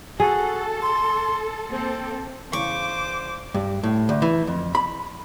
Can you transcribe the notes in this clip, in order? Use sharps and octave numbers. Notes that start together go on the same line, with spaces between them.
F#4 G#4 A4
C6
A#3 C4 A4 C5
E2 C#3 C5 C#6 D6
G2
A2
D2
E3
F2
B5